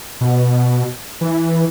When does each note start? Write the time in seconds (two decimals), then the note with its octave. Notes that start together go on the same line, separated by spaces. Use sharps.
0.21 B2
1.21 E3